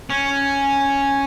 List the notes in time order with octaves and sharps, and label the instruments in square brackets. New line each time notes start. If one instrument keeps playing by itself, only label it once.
[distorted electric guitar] C#4